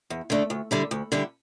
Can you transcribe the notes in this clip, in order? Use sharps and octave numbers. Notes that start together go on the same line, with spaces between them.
E2
D3 A3 D4
D2
D3 G3 E4
D2
D3 G3 E4